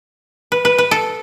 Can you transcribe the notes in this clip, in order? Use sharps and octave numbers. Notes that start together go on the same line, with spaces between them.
B4
B4
B4
A4